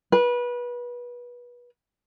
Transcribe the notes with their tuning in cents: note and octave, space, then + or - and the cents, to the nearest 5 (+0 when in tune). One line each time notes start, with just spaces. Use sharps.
B4 -25